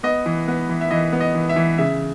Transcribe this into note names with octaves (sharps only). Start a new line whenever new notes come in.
B3 D#5
E3
B3
E3
E5
E3 D#5
B3
D#5
E3
E5
E3
C#3 E5